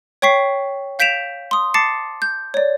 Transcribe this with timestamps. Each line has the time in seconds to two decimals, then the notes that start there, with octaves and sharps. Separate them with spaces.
0.22 C#5 G5 C#6 B6 C7
0.99 F5 G6 B6 D7 E7 F7
1.51 C6 D#6
1.74 A5 D6 A6 C7 C#7
2.22 G6
2.54 C#5 D5